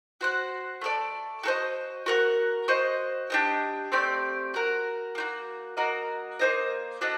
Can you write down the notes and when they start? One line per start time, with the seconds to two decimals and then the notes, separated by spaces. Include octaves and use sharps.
0.21 F#4 C5 F#5
0.81 A3 D4 A4 D5
1.43 F#4 A4 C5 D#5
2.06 F#4 A#4 F#5
2.68 F#4 C5 D#5
3.30 D4 G4 C5 D#5
3.92 A3 C4 G4 D5
4.54 F#4 A#4 F#5
5.15 A#3 D#4 F#4
5.77 A#3 F#4 A#4 D#5
6.39 A#3 F#4 C5 D#5
7.01 D4 F#4 A4 D#5